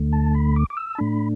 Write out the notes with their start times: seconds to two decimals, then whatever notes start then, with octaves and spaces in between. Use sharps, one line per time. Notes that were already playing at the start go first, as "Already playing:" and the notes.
Already playing: D2 D3 A3
0.13 A5
0.34 B5
0.56 D6
0.70 D6
0.77 E6
0.95 A5
0.98 A2 A3 D4 B5